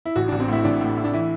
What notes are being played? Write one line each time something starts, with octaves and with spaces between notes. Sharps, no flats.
E4
A1 F#4
A1 D4
C4
A2 E4
A1 D4
A2
A2
D4
E3 E4